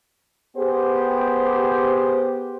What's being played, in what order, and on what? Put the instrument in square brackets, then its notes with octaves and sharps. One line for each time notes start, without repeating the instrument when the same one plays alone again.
[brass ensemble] B3 G4 G#4 C5